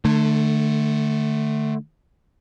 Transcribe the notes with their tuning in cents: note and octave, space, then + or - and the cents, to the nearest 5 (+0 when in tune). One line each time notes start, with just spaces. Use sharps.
D3 +30 A3 +0